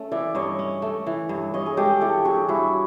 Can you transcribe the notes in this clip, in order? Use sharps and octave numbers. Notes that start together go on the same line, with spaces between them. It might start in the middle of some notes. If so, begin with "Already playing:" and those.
Already playing: A3 C#4
E3 D5 E5
G2 C#5 D#5
C#4
A3
E3
G2
G2 C#5 D#5
G#4
G#3 G4 A4
E3 G4 A4
G2 F#4 G#4
G2 E4 F#4